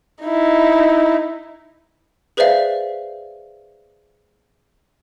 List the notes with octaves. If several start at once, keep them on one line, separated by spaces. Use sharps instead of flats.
D#4 E4
G#4 B4 C5 D5 E5 F5